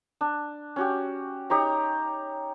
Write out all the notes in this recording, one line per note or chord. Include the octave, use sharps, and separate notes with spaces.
D4
C#4 F#4 G4
D#4 G4 C#5 A#5